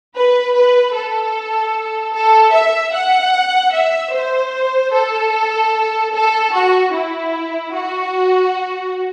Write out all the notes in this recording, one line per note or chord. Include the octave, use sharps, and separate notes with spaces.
B4
B4
A4
A4
E5
F#5
E5
C5
A4
A4
F#4
E4
F#4